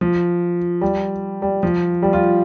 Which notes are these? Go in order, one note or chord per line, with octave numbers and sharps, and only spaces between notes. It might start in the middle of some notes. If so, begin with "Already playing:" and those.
F3
G3
G3
F3
G3
F4